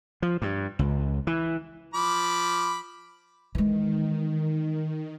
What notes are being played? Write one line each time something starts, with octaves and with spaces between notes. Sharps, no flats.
F3
G2
C#2
E3
F3 B5 D6
D#3 E3 G#3